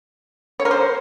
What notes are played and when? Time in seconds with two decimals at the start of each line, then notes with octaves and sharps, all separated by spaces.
0.60 C#5
0.65 A#4
0.71 C5